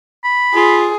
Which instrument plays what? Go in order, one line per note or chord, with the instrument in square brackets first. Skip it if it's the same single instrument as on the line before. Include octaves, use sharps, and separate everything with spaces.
[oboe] B5
[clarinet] F4 [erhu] G#4